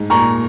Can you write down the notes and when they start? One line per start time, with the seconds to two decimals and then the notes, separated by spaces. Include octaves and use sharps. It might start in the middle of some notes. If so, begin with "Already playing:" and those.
Already playing: G#2
0.10 A#2 A#5 C#6